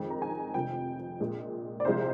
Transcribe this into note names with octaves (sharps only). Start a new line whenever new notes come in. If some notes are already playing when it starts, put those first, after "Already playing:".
Already playing: F2 D#3 G#3
A#5
G#5
F1 F2 C3 F3 G5
A#1 A#2 G#3
D5
C2 C3 F3 G#3 C5